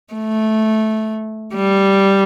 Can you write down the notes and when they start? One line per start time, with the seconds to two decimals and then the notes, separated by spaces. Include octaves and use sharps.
0.13 A3
1.55 G3